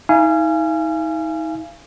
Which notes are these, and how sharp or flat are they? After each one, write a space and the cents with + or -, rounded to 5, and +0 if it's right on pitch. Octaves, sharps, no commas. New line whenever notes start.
D#4 +45 F5 -35 G#5 +0